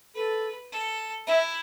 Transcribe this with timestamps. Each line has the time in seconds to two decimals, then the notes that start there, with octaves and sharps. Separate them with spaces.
0.15 A4 B4
0.72 A4
1.27 E4 E5